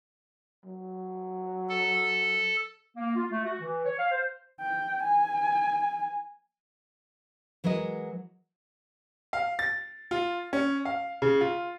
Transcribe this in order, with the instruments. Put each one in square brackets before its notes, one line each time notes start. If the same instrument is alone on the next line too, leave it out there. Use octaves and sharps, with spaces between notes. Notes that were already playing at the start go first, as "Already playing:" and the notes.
[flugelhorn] F#3
[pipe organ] A4
[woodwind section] A#3
F4
A3
F#4
E3
C#5
F5
C5
[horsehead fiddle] G5
G#5
[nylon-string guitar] E3 F#3 G#3 A#4 D#5
[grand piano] F5
A6
F4
C#4
F5
C#3
F4